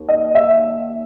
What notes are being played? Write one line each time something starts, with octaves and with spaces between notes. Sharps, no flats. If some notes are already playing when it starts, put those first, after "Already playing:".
Already playing: D#2
D#5
E5